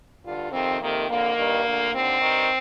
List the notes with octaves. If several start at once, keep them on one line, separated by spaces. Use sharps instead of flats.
G2 D3 F4
F2 C3 D#3 C4
F2 C3 D#3 A#3
F2 D3 A#3
G2 D#3
D2 D3
D#2 D3 C4
G2 D#3